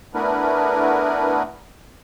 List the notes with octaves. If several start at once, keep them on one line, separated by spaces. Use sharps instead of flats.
A3 B3 D4 E4 A#4 B4